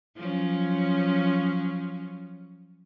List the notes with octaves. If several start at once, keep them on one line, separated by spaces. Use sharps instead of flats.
F3 F#3 C#4